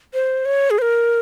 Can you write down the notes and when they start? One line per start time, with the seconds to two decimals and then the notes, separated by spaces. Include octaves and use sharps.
0.14 C5
0.45 C#5
0.70 G#4
0.78 C5
0.82 A#4